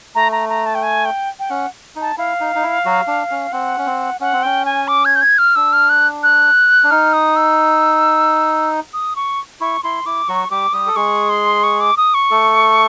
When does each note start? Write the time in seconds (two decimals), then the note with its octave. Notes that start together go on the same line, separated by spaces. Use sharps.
0.15 A3 A#5
0.32 A#5
0.49 A#5
0.66 A5
0.75 G5
0.83 G#5
1.05 G5
1.39 G5
1.50 C#4 F#5
1.96 D#4
2.01 A5
2.17 E4 F5
2.40 D#4
2.55 D#4
2.63 E4
2.85 F#3 F#4
3.07 D4
3.31 C#4
3.53 C4 F#5
3.78 C#4
3.86 C4
4.21 C#4 F#5
4.33 C4
4.43 C#4 G5
4.65 G#5
4.88 D6
5.05 G#6
5.16 G6
5.21 G#6
5.38 F6
5.56 D4 E6
5.73 F6
5.90 F#6
6.23 F#6
6.84 D4
6.91 D#4 F6
7.13 D#6
7.36 E6
8.94 D#6
9.16 C#6
9.61 E4 C#6
9.83 E4 C6
10.06 E4 D6
10.28 F#3 F#4 C#6
10.51 G3 G4 D6
10.73 G3 G4 D#6
10.87 A4
10.96 G#3 G#4 C#6
11.30 C6
11.63 C#6
11.80 D6
11.97 D#6
12.14 C#6
12.31 A3 A4